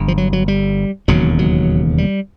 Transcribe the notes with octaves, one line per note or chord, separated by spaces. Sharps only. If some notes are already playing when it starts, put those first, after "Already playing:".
Already playing: G1 G2
F3
F#3
F#3
G3
E1 D#2 C#3 F#3
F#3
G3